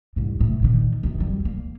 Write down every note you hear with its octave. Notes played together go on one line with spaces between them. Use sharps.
C2 G#2
A2
A#2 D#3
F#2 D#3
D1 G3
A#3